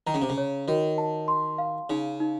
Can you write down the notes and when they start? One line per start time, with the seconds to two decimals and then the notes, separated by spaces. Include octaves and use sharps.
0.07 D#3 A#5
0.14 C#3
0.22 C3
0.29 C#3
0.38 C#5
0.68 D#3 F#4
0.98 A5
1.28 C6
1.58 F5
1.90 C#3 D#4
2.20 D#4